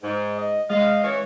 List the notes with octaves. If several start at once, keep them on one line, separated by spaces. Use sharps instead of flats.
G#2
D#5
G#3 D#5 F5
E3 C#4 C#5